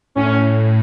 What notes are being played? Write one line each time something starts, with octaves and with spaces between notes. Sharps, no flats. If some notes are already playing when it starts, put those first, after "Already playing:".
A2 C#4